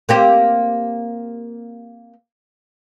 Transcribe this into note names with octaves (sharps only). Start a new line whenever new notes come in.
A#3 C4 G4